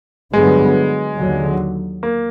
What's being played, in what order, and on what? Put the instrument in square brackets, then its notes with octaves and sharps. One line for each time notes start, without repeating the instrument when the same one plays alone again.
[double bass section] G2 D3 F#3 B3 [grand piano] G#3
[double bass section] D#2 D3 F#3
[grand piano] A#3